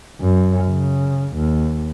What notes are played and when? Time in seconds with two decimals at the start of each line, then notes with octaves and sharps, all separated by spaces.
0.21 F#2
0.67 C#3
1.36 D#2